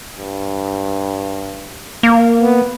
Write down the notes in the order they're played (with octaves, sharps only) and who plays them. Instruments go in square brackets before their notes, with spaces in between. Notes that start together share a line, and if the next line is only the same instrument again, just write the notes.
[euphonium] G2
[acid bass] A#3
[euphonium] B3